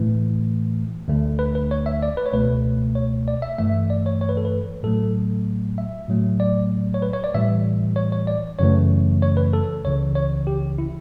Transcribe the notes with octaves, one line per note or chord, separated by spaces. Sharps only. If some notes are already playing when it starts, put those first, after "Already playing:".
Already playing: A2 E3 A3
D2 D3 A3
B4
B4
C#5
E5
D5
B4
C#5
C#2 B2 A3 B4
C#5
D5
E5
G2 E3 A3 E5
D5
C#5
C#5
B4
A4
B4
A2 F#3 A3 A4
E5
A2 F#3 A3
D5
C#5
B4
C#5
D5
A2 E3 G3 E5
C#5
C#5
D5
F#2 C#3 E3 A3 C#5
C#5
B4
A4
C#2 C#3 E3 C#5
C#5
G4
E4